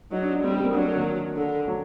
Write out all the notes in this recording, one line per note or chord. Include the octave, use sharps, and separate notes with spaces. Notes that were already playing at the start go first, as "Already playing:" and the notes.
F#3 D#4
D4
D4
G3 C4
C4
A#3
F#3 D4
A#3
D#3
D3
F#3